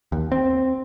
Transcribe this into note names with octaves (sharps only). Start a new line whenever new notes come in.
D#2
C4